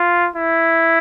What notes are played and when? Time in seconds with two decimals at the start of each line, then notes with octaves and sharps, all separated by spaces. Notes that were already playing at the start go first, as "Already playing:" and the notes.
Already playing: F4
0.36 E4